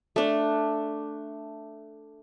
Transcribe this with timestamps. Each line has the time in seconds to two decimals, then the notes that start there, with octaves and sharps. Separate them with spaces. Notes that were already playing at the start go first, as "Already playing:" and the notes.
0.16 A3 D4